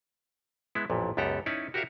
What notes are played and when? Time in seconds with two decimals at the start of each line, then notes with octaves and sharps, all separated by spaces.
0.75 G#3 B3 E4
0.90 A1 F2 A#2
1.17 C#2 F#2 B3 G4 A4 A#5
1.46 C#4 D#4 E4 C#5 D5
1.74 F#4 G4 A#4 C#5 E5 F5